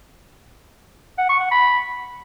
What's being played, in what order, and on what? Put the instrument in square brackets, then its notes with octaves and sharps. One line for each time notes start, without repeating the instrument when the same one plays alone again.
[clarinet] F#5
C#6
F#5
B5